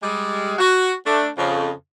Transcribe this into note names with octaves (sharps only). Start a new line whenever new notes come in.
G3 G#3
F#4
A3 D4
F2 C#3